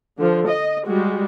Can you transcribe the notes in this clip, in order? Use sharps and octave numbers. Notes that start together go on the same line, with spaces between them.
D3 F3
D#5
G3 G#3 F#4